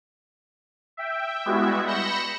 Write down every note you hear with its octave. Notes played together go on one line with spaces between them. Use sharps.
E5 G5
G3 G#3 B3 E4 F#4 E5
B5 G6 A#6 C#7 E7